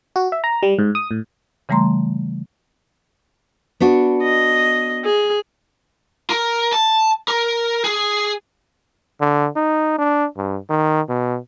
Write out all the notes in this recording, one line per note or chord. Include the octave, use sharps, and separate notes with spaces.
F#4
E5
A#5
G3
G#2
D#6
A2
C#3 E3 G3 A3 A#5 C6
B3 D4 F#4
D#5
G#4
A#4
A5
A#4
G#4
D3
D#4
D4
G2
D#3
B2